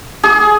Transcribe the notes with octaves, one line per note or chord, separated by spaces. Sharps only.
G#4